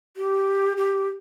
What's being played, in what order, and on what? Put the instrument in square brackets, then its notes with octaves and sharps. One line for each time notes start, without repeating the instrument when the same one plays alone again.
[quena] G4
G4